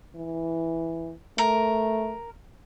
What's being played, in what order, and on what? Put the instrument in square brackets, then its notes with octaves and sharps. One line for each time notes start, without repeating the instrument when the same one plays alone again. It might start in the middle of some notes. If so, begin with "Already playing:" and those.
[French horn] E3
[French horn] A3 [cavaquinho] A#4